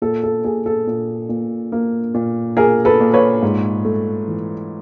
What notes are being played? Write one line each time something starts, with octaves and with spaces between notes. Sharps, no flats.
A#2 A4
A4
A#2 G#4
A4
A#2
A#2
A#3
A#2
A#2 G#4 A#4
A4 B4
A#2
B4 C#5
G#2
A3
E3